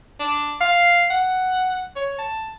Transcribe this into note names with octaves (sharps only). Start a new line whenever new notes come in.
D4
F5
F#5
C#5
A5